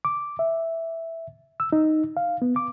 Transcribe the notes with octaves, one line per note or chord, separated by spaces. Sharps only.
D6
E5
E6
D#4
F5
B3
D6